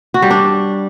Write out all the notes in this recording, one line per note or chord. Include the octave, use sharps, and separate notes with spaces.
F#4
G3
D4